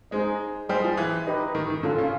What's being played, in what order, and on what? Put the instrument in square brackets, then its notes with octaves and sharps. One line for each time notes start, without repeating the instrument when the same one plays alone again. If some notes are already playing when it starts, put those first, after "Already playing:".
[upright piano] G#3 [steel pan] D#4 G#4 C5 D#5
[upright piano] G3 [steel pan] G#4 C5 D#5 G5 C6
[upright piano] F3
E3
[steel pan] D#4 G4 B4 D#5
[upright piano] D#3
D#3
[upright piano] D3 [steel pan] C#4 F4 A4
[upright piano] C#3